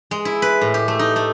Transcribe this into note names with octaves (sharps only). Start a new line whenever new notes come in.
G#3
E4
B4
A2
G4
A3
D#4
A3